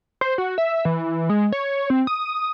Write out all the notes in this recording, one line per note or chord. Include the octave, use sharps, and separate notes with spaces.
C5
F#4
E5
E3
G#3
C#5
C4
D#6